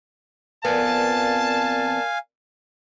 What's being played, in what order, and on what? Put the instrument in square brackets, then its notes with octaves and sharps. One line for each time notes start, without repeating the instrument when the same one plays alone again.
[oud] F2 B3 [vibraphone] A#4 D5 [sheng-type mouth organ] F5 G#5 [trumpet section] A5